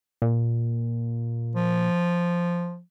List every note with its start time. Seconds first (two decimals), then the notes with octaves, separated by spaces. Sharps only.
0.22 A#2
1.56 F3